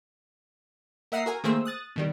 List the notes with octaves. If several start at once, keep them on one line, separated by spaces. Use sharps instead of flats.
A#3 E5 F#5 A#5 D#6 C7
F#4 A#4 G#5
D#3 A3 A#3 G#4 C5 E6
D#6 F#6 A6
B2 D#3 G3